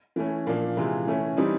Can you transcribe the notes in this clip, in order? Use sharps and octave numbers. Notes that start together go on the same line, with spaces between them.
E3 A3 C#4
A#2 F3 A#3 D4
C3 E3 G#3 C4 F4
E3 A3 C#4
E3 G3 C4 D#4